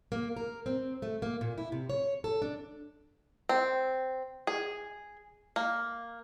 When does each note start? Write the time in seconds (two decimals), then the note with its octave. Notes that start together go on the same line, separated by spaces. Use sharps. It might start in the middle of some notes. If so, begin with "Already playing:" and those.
0.12 A#3
0.36 A#4
0.66 C4
1.02 A3
1.22 A#3
1.41 A#2
1.58 E4
1.72 C3
1.90 C#5
2.24 A4
2.42 D4
3.49 C4
4.47 G#4
5.56 A#3